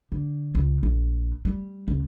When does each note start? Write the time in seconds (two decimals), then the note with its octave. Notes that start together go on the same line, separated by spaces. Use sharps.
0.12 D3
0.55 C#2
0.83 A#1
1.45 G3
1.88 C#2